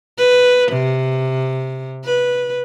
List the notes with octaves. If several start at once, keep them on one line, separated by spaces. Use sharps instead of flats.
B4
C3
B4